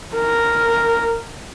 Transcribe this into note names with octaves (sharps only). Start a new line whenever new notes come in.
A#4